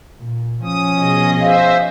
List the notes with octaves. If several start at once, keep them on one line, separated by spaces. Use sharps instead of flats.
A#2
F3 C#4 D#6
B2 G#4 D#5
C5 E5 F5